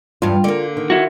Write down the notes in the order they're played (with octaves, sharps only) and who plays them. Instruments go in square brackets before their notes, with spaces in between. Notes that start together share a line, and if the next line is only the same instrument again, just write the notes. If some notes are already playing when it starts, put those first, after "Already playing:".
[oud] E2 G2 [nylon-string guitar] F4
[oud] D3 A#3
[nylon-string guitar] D#3
[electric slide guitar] E4 F#4